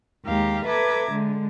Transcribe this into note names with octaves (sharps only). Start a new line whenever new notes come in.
D#2 G#3 G4 F5 A#5
A4 B4 E5 A#5 D6 G#6
D3 G#3